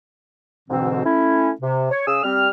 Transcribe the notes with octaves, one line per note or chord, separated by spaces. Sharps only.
D2 G#2 B2 D3 E3 C4
A3 C#4 E4
C3
C#5
C#3 G#4 D#6 E6
G3 C4 F6